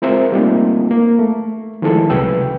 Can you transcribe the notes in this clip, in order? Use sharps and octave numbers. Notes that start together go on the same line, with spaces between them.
G#3 C4 F4 A#4 C5 E5
G3 A3 A#3 C4 D#4 F4
A#3
A3
D#3 F3 G#3 A3 E4 A4
C2 C#3 F#3 B4 G5 E6